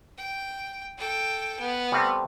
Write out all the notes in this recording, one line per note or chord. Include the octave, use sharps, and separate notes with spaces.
G5
A4 G5
B3
G3 A3 C4